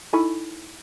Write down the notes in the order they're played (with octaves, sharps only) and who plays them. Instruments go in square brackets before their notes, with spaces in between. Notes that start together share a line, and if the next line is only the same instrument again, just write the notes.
[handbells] D#4 E4 A4 G#5 B5 C#6